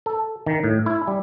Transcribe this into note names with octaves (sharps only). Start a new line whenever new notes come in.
A4
D#3
A2
E4
G3